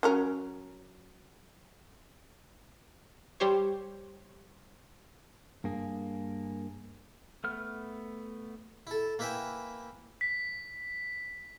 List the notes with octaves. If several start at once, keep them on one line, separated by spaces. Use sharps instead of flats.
F#3 C#4 A#4
G3 G4 C5 C#5
G2 A#3 G#4
A3 B3 F6
E4 A4
A#3 E4 B4 E5 G5 G#5
B6